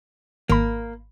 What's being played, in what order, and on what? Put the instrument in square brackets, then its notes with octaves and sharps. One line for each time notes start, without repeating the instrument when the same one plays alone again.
[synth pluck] G#1 B5 [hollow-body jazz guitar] A#3